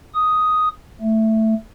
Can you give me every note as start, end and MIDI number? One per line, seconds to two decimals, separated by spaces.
0.14 0.68 87
1.01 1.54 57